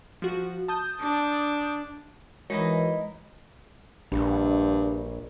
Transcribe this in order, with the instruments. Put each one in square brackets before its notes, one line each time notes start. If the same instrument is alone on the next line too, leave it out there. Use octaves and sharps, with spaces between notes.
[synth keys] F3 F#4
A5 D#6 G6
[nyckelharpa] D4
[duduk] E3 [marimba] G#3 [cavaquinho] D#4 E4 D#5 [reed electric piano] F#4 A#4 C#5
[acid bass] A#1 [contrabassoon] G2